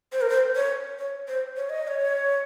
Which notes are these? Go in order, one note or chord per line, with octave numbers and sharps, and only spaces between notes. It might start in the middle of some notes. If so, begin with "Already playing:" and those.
C5
A#4
C5
C#5
C#5
C5
C#5
D#5
D#5
C#5